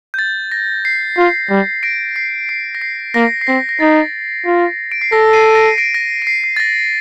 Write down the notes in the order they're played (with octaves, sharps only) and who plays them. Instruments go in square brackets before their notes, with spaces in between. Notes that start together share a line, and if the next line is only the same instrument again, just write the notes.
[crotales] G6
A6
A#6
C7
[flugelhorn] F4
G3
[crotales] A#6 D7
C7
C7
A#6
C7
[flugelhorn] A#3 [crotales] A#6
[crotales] C7
[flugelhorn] C4 [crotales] A#6
[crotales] A#6
[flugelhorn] D#4 [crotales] A6
[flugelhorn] F4
[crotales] D7
C7
[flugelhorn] A4 [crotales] A#6
[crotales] C7 D#7
D#7
A#6 D7
A#6 D7
A#6
D7
C7
C7
A6
A#6